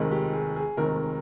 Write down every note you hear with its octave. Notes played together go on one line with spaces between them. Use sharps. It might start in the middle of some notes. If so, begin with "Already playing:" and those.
Already playing: F1 D#2 D#3 G#3 C4
G4
G#4
G#4
F1 D#2 D#3 G#3 C4 A#4